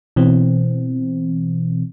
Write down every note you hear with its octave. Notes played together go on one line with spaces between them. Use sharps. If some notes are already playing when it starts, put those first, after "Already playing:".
B2 E3 C4